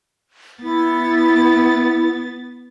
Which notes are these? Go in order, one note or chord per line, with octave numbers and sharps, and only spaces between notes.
B3 E4 A6